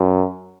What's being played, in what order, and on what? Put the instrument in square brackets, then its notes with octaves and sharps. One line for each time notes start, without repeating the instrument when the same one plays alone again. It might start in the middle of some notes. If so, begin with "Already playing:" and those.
Already playing: [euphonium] F#2